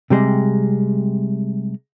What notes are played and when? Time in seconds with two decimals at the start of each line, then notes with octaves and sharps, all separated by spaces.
0.10 C3 G3 G#3